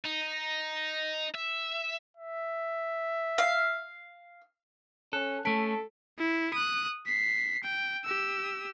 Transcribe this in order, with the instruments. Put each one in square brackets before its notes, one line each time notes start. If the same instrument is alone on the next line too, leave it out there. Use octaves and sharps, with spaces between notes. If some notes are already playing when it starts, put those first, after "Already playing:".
[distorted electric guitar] D#4
E5
[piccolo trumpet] E5
[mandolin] F5
[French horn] C#4 [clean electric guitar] A4 [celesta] F#6
[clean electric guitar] A3 C#4 [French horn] A4 [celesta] A5 B6 D7
[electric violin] E4
D#6 F#6
B6 C7
G5
G4 E6